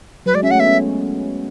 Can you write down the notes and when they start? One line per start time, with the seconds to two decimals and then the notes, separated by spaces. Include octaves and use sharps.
0.26 F#3 B4
0.34 G#3 D5
0.43 C#4 E5
0.51 A3 F#5
0.60 B3 E5
0.68 C#4